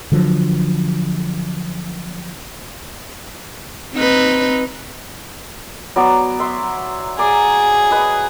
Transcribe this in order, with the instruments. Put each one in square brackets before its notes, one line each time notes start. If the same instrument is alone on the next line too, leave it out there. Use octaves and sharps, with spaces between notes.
[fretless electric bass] D3 F3 F#3
[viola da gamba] C4 D#4 B4
[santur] F#3 B3 D5
E5 C6
[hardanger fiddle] G#4 [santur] D5 A#5
[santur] B4 D#5